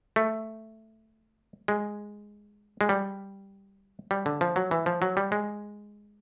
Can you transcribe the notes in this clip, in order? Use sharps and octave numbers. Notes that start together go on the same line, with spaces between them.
A3
G#3
G#3
G3
G3
D3
F3
F#3
E3
F3
F#3
G3
G#3